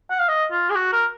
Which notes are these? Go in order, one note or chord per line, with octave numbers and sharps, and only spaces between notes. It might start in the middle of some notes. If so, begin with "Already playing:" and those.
F#5
F5
D#5
F4
G#4
F#4
A#4